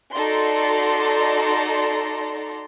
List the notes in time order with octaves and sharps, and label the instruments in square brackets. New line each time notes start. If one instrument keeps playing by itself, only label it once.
[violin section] D#4 F#4 A4 D5 A#5 C6